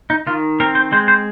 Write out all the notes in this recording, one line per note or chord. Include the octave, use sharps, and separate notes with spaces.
D#4
D#3 F4
C4 A#4
C5
G#3 C5
C5